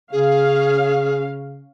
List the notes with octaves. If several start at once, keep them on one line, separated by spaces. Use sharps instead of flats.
C#3 C#4 G#4 F5